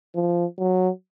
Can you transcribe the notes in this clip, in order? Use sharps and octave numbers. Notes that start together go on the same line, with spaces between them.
F3
F#3